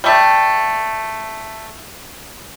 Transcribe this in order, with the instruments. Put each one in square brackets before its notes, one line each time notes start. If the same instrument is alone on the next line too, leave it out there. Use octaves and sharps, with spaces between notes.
[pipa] G3 A3